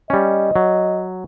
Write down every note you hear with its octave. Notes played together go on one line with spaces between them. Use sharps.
G3 C#4 D#5
F#3